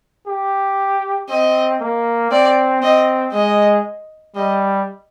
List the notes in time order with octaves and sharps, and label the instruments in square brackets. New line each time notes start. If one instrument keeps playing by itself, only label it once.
[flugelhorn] G4
[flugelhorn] C4 [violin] D#5
[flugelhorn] A#3
[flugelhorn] C4 [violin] D5
[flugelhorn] C4 [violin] D#5
[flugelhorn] G#3 [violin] D#5
[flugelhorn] G3 [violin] D#5